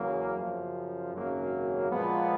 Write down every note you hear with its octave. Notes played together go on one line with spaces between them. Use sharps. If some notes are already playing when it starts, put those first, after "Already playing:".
Already playing: E2 C#3 F#3 A#3
F#2 C#3 F3
G#1 F#2 C#3 F#3 A#3
A#2 F3 G#3 B3